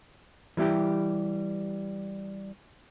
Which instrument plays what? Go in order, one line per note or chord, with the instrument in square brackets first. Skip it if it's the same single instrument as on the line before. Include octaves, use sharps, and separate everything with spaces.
[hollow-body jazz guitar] E3 G3 E4 G4